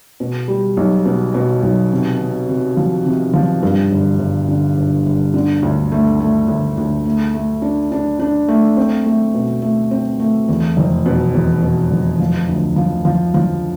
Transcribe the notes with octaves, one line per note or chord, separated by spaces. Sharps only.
B2
G3
B1
B2
B2
B1
C3
C3
C3
F3
C3
F3
G2
G1
G1
D3
G1
G1
D3
D2
A3
A3
D2
D2
A3
A3
D4
D4
D4
A3
C4
A3
B2
A3
C4
A3
E2
F1
B2
E2
B2
F1
F3
D2
F3
F3
F3